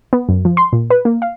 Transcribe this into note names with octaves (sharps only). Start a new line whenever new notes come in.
B3
F#2
F3
C6
A#2
B4
A#3
F5